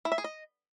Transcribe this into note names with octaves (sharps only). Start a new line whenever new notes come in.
E4
E5
G#4
D#5